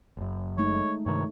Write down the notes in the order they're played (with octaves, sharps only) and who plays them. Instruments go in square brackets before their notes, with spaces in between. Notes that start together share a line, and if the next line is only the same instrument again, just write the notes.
[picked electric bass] F#1 F#2
[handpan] G#3 A3 D#4 [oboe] C#5
[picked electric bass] G2 C3 D#3 [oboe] C#5